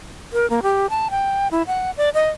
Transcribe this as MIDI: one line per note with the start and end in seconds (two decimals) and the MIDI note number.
0.33 0.48 70
0.50 0.60 58
0.63 0.87 67
0.90 1.08 81
1.11 1.48 79
1.51 1.62 64
1.67 1.91 78
1.97 2.10 74
2.14 2.29 75